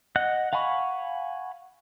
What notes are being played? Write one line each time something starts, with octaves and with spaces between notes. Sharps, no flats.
D#5 F#5 F#6
F5 F#5 G#5 B5 C#6